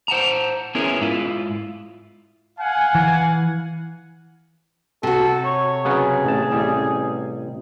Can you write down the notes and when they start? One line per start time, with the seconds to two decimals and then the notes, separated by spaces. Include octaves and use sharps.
0.08 C5 F#5 A5 A#5
0.75 B3 C#4 E4 G#4 A#4
1.01 G#2 E4 F4
2.59 F5 F#5 G#5
2.95 E3
5.03 C3 F#4 A4
5.45 C#5
5.85 C#3 F#3 B3 G#4
6.25 A1 A5
6.52 A1 G3